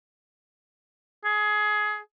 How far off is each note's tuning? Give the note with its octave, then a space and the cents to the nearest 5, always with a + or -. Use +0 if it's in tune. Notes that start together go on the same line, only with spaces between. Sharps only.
G#4 +20